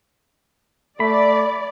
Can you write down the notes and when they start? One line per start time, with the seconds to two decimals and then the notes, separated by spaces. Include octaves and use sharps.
1.00 A3 D5 B5